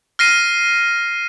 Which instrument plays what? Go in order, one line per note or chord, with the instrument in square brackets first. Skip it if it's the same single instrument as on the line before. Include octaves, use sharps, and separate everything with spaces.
[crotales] F6 A#6 C7 D#7